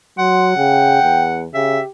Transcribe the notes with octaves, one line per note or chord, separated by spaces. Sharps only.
F#3 F#5 C6
C#3 G5
E2
C#3 G4 E5